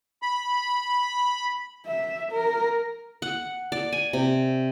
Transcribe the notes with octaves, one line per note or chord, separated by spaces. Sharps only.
B5
E5
A#4
F#5
D5
G#5
C3